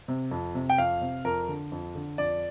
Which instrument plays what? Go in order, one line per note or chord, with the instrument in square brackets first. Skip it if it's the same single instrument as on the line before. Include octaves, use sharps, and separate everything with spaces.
[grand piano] C3
F2
C3
G5
F2 F5
C3
F2 A#4
D3
F2
D3
F2 D5